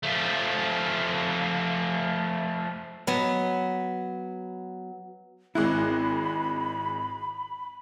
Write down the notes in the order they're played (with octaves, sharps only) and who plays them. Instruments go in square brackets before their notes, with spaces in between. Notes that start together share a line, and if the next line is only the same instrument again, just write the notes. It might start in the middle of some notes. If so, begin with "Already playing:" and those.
[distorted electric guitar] F3 A3
[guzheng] F#3 B3
[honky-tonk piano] G#1 G#3 F#6 [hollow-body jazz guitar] E4 [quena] B5